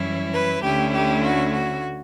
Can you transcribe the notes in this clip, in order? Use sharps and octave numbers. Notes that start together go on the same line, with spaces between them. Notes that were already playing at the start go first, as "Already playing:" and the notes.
Already playing: F#2 E3 G3 C#4 E4
B4
D2 D3 A3 C#4 E4 G4
G4
F#4
F#4